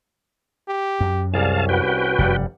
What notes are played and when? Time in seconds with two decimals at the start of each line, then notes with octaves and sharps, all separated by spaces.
0.68 G4
1.01 F#2
1.34 C2 C#4 G#4 D5 F5 A5
1.69 F#4 B4 G5
2.18 F1 F#2 G3 F#5